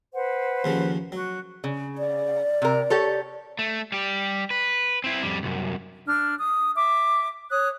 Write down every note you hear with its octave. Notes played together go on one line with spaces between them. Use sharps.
B4 C5 F#5
D#2 C#3 F3
F#3 F#4
C#3
D5
C3 A#4
G4 A4 C#5
A3
G3 G4
B4
C4 E4
F2 G3
C2 F#2
D4 F6
D#6
E5 D6
C#5 D#6 F#6